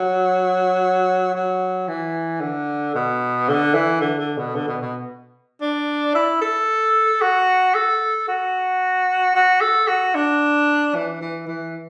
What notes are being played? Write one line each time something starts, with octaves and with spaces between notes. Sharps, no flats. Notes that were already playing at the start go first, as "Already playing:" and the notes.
Already playing: F#3
F#3
E3
D3
B2
D3
E3
D3
D3
B2
D3
B2
B2
D4
E4
A4
F#4
A4
F#4
F#4
A4
F#4
D4
E3
E3
E3